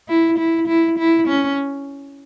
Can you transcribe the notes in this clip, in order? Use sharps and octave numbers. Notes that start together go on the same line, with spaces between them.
E4
E4
E4
E4
C#4